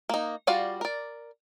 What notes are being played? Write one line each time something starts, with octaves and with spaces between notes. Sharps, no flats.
A#3 D#4
G3 F4 F#4 D5 F5
A#4 D5